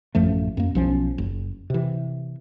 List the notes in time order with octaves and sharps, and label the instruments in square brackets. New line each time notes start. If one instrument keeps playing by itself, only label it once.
[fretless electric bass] A1 F#2 F3 A3
F#2 A#3
B1 F3 C#4
F#1
C3 E3